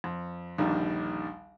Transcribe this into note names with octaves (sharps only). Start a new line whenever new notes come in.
F2
A#1 D#2 D3 D#3 G3